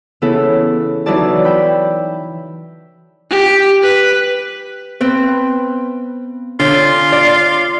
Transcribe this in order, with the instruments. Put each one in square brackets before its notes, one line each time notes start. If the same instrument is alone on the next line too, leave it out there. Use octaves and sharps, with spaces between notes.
[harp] C#3 E3 B3 E4 A4
E3 F#3 D#4 E4 D5 A5
E5 G5 B5
[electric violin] G4
B4
[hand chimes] B3 [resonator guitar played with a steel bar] C4 B4
[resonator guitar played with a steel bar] D3 [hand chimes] D4 C#5 [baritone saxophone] F4
[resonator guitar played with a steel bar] D5